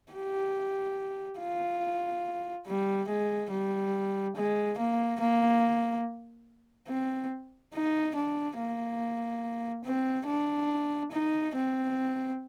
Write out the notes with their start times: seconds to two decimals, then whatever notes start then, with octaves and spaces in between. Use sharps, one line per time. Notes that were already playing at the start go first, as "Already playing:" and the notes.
0.13 G4
1.40 F4
2.67 G3
3.09 G#3
3.51 G3
4.36 G#3
4.78 A#3
5.20 A#3
6.89 C4
7.74 D#4
8.16 D4
8.59 A#3
9.85 C4
10.27 D4
11.12 D#4
11.55 C4